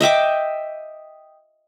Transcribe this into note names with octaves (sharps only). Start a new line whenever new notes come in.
D#5 E5 G5 D6